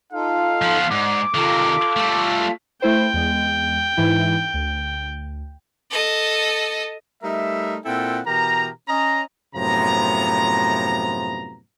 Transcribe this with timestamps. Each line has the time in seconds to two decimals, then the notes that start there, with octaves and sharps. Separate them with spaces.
0.13 D#4 F4 A4 F5
0.62 F3 B3
0.91 G#2 D5 F#5 D6
1.35 C3 D#3 F4 A4 F5
1.96 G3 A3
2.82 A3 E4 C5 G5
3.13 E2 G#3
3.97 G#2 E3 E4
4.54 D2
5.91 A4 D#5
7.23 G3 A3 D#4 A#4 E5
7.85 A#2 C4 E4 A4 F#5 G5
8.26 B2 E3 G4 A#4 A#5
8.89 C#4 D#5 A#5
9.55 F#2 A2 C3 F3 B3 A#5